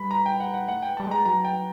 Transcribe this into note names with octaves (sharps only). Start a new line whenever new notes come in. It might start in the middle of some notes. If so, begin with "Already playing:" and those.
Already playing: G3 B5
A#5
G5
F#5
F#5
A3 F#5
G#3 G5
G3 A5
G#3 A#5
F#3 A#5
G5